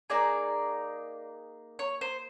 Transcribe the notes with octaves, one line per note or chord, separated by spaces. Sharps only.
A#3 D#4 G#4 D5
C#5
C5